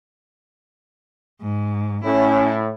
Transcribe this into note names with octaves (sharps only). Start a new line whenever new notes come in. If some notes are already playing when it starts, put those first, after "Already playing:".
G#2
A2 C#4 E4